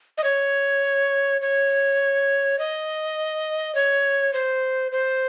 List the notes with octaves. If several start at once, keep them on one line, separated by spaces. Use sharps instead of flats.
D#5
C#5
C#5
D#5
C#5
C5
C5